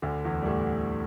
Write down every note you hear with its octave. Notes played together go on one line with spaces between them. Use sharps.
D2 D3
E2 E3
G3
A2 A3